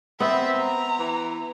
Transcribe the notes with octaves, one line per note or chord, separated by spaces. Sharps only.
B3 C4 E5
A#5
E3